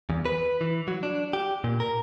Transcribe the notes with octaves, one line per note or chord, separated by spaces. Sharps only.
E2
B4
E3
F#3
D4
G4
A#2
A#4